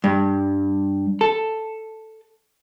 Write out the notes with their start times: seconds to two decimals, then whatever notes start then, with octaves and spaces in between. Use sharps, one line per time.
0.04 G2
1.21 A4